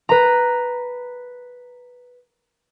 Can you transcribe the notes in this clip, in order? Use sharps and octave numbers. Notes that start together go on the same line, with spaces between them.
B4 A#5